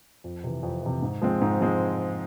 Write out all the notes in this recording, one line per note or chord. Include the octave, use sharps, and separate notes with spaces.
F2
C3 E3
F2
C3 E3
G#2
F3 G#3 C4
G#2
F3 G#3 C4